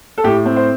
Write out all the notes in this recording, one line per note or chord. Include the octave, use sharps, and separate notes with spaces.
A4
A2 G4
C4
C5